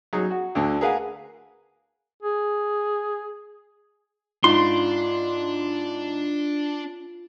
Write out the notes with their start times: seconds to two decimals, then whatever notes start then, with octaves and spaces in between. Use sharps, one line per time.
0.13 F#3 D#4 G#4
0.31 F#4
0.55 D2 D3
0.81 G#4 A#4 B4 F5 F#5 G#5
2.23 G#4
4.44 G#2 D4 F4 C6